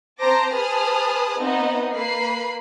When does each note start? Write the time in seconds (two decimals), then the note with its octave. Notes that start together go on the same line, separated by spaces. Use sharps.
0.20 C4 C5 A5 A#5 D6 A#6
0.53 G#4 B4 C5 A5 D#6 F6
1.39 B3 C4 D#4 D#5 E5
1.93 A#3 B4 B5 C7